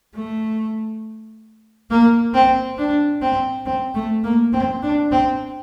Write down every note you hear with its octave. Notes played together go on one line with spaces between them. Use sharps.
A3
A#3
C4
D4
C4
C4
A3
A#3
C4
D4
C4